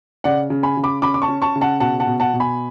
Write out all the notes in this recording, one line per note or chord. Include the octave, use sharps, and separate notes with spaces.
C#3 D5 F#5
C#3
G#5 B5
C#3
B5 D6
C#4 B5 D6
D6
A5 C#6
C#4
A5 C#6
C#3
F#5 A5
B2 F#5 A5
F#5 A5
B2
F#5 A5
B2
G#5 B5